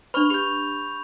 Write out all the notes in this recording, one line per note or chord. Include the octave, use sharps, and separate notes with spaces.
D4 B4 B5 C#6 F7
G4 G6 F7